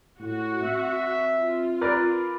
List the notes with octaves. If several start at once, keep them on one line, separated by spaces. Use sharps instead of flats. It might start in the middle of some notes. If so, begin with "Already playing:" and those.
A2 F#4
C4 E5
F4
A#4 B4 D5